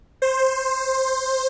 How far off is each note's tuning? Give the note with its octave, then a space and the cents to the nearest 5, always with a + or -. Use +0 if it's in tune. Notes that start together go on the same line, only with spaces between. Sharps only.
C5 +10